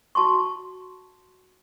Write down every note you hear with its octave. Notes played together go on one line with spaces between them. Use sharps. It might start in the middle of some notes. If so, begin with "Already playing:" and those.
F#4 A5 C6 C#6